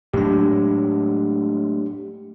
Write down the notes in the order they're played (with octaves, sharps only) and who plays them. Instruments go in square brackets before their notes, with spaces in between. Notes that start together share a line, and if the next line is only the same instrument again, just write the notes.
[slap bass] A2 F#3 G#3 [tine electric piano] D4 G4